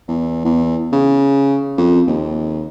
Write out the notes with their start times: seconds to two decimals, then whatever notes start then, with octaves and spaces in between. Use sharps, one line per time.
0.08 E2
0.45 E2
0.92 C#3
1.78 F2
2.07 D#2